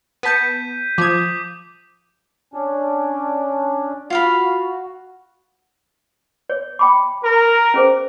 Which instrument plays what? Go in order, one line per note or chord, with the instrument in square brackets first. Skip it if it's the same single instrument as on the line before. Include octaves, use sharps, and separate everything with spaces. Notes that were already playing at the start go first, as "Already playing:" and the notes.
[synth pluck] B3 A5 C#7 [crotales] G6 B6 D#7
[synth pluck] F3 G#6 [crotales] D6 D#6
[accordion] C#4 D4
[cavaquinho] F4 F5 B5 [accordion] F#4
[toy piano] C#5
G5 B5 D6
[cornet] A#4
[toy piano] C#4 G#4 C5